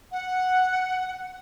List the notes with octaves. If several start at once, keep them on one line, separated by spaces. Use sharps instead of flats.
F#5